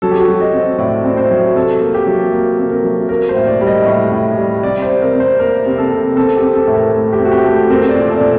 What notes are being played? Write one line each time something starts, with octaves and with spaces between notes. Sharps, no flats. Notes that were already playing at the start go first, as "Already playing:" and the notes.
F#3 A4
G4
F#4
F#3 G4
D#5
C4
A2 D5
C4
C5
F#3
C3 A4
A#3
G4
F#3
A#3
C3
A#4
F#3
A#3 A#4
C5
A2
D5
G3
D#5
A2
A2
G3
C3 D5
C5
C3
A#4
C3
C5
A#3 A#4
C3
A4
C3
C4 A4
G4
C4
A4
A2
A#4
A3 A4
G4
C4
F#4
G4
A3
C4 A#4
C5
D5
A#2
A4
A#2